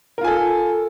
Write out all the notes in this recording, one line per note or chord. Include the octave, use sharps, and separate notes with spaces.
F4 A4 A#4 G#5